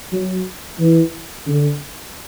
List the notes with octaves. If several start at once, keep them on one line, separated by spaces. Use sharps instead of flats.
F#3
E3
D3